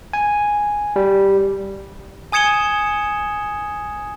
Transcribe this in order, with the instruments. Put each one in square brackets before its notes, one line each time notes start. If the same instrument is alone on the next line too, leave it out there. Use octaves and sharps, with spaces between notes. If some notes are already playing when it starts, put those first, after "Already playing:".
[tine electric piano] G#5
G3
[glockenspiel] G#5 D#6 G#6 C#7 E7 G7